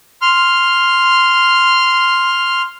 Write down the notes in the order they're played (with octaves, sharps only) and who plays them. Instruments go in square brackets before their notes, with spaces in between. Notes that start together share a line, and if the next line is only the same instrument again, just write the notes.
[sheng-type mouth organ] C6 F6